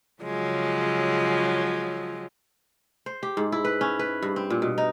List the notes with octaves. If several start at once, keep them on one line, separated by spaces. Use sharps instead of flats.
C#3 F3 F#3 G#3
C5
G4
G#2
E4
B4
C#4
B4
G2
C4
A#2
B2
D#4